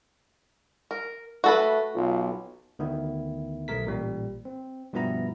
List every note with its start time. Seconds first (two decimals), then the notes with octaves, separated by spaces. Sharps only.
0.91 A#4
1.44 A3 F#4 A4 B4
1.95 B1 F4
2.79 D2 D#3 B3 E4
3.68 B1 A3 A#4 B6
3.85 A1 A#2 G3
4.45 C4
4.93 G2 B2 F3 B3 E4 A#5